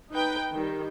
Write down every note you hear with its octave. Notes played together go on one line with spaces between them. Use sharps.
D#4 B4 G5
D#3 G3